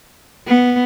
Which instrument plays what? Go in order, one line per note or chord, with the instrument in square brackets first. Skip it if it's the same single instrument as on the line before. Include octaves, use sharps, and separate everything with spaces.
[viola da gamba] B3